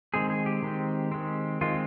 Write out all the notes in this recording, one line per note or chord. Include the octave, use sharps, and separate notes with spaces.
D#3 G#3 C4 G#4
G#4
G4
D#3 G#3 C4
D#3 G#3 C4
D#3 G#3 C4 F4